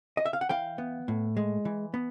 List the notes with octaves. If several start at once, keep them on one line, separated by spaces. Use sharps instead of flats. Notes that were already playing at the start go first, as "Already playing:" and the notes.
D#5
E5
F5
F#5
E3 F5 G5
B3
A2
G#3
E3
B3